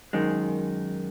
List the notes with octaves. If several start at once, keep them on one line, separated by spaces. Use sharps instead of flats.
F#2 D#3 G#3